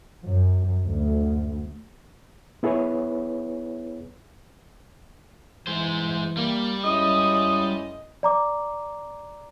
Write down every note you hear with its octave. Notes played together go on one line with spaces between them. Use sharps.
F#2
D2
B3 E4 G#4 B4 C#5
E3 G#3 C5
G3 A#3
F#2 G#3 C#4 E4 D#5 D#6
D5 A#5 D6